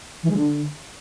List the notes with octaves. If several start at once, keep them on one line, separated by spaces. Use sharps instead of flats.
E3
G#3
D3